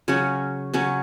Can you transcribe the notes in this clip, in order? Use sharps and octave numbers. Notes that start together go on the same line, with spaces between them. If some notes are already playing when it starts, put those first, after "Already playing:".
C#3 F#3 C#4
C#3 F#3 C#4